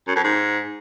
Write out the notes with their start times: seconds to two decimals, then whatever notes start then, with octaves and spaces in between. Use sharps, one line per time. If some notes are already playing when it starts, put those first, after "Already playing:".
0.07 F#2
0.16 F2
0.24 G#2